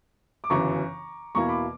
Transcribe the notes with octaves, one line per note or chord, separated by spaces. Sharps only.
D6
G1 F#2 C#3 E3 A#5 C#6
E2 B2 A#3 E4 A#5 C#6
B5 D6